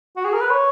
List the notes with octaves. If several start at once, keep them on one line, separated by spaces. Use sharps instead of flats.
F#4
G#4
A#4
B4
C#5